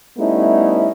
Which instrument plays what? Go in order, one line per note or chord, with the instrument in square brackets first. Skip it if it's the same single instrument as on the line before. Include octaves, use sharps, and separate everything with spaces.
[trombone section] G3 A3 B3 C#4 D#4 E4